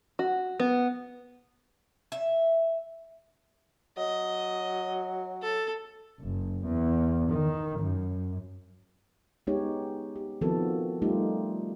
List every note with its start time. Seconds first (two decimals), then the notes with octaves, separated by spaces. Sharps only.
0.19 F#4
0.60 B3
2.12 E5
3.97 F#3 D#5
5.42 A4
6.20 F#1
6.65 E2
7.31 D#3
7.80 F#2
9.47 G#3 B3 C#4 D#4 G4 C#5
10.16 G4
10.41 D#3 F3 B3 C4 F#4 A4
11.02 G3 A3 D#4 F4 G4